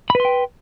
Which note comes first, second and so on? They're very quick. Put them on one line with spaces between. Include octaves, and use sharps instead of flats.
B5 B4 C6 G5